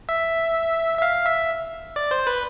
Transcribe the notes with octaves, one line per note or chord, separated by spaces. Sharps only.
E5
E5
F5
E5
D5
C5
B4